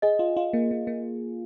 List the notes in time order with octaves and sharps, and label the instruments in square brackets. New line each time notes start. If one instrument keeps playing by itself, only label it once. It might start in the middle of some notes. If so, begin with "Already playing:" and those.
[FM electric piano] G#4 [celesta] D#5
[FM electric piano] F4
F4
A#3
A#3
A#3